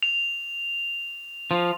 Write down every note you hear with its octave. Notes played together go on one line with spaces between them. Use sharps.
F7
F3